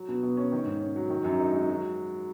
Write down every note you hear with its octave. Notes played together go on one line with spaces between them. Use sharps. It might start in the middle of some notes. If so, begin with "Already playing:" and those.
Already playing: F#3
B2
B2
C#4
D#3
G#2
C#4
F#3
D#3
F#2
D#4
G#3
F#3